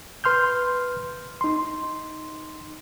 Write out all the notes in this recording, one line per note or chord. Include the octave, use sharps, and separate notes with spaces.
B4 C6 F6 G6
D#4 C6